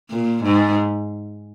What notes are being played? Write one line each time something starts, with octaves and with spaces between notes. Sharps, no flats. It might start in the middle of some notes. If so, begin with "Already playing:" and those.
A#2
G#2